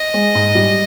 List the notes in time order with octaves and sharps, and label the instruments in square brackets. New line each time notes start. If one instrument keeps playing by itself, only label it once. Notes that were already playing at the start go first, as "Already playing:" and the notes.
Already playing: [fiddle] D#5
[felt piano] G#3
G#2
G3